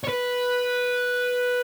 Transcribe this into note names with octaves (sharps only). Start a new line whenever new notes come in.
C#5
B4